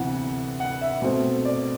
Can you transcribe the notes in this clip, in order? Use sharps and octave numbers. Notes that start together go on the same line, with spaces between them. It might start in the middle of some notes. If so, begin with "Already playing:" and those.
Already playing: D2 C3 E3 B3 F#5
F#5
E5
B2 A3 C4
D5